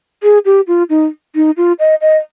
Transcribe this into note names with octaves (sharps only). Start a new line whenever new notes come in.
G#4
G4
F4
D#4
D#4
F4
D#5
D#5